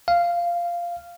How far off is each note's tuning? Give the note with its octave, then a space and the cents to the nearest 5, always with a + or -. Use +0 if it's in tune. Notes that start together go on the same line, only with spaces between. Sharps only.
F5 -10